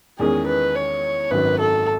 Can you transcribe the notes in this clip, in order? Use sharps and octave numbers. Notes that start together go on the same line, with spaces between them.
E2 D#3 G#3 C#4 G#4
B4
C#5
G#1 F#2 D#3 F#3 B4
A4